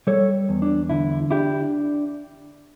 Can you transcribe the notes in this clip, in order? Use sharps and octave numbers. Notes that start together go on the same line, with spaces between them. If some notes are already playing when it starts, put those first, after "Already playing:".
G3 A4 C#5
E2
D4
D3 E4
D4 E4 G4